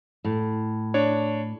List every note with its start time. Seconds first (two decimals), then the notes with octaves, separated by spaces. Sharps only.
0.24 A2
0.94 D4 C#5